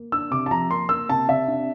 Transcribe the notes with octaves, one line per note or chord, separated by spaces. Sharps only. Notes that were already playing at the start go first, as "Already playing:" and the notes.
Already playing: A#3
D4 E6
C3 D6
A5
F3 A#5
A#3 C6
A#3 E6
C3 A5
C3 E5
D4